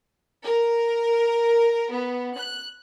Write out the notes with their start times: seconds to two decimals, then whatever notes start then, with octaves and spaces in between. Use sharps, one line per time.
0.44 A#4
1.91 B3
2.36 F#6